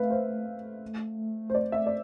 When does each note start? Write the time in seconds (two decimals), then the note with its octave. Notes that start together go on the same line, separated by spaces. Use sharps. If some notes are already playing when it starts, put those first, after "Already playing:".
Already playing: A3 B4 E5 F5
0.10 C5
1.50 C5
1.55 D5
1.72 E5
1.87 D5